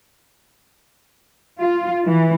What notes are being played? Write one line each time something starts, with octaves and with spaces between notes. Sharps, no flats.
F4
E3